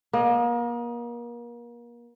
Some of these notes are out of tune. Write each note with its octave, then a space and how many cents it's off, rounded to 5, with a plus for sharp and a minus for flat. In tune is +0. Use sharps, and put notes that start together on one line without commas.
A#3 +35 D#5 +0